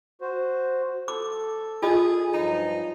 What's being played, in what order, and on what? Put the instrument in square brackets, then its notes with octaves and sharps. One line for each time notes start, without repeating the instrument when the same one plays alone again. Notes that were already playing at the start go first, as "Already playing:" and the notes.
[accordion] F#4 C5
[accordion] A4 [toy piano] D6
[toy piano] F4 D#5 [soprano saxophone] G#4
[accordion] G2 F3 F#3 [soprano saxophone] D#4